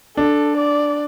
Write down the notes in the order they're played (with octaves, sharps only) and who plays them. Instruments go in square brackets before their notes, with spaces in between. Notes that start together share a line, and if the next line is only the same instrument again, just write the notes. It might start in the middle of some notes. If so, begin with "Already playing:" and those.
[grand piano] D4 [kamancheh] A4
[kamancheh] D5